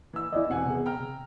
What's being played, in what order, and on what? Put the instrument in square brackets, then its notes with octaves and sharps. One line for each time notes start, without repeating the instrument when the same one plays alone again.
[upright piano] E3 E6
[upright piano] E2 E3 [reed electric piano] E4 D5 D#5
[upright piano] E1 F#5 G#5 [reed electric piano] C4
[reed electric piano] C3 B3 G#4
[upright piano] G5 A#5 F6
[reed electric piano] C3